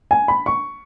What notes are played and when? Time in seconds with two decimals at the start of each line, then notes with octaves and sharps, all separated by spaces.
0.11 G#5
0.28 B5
0.46 C#6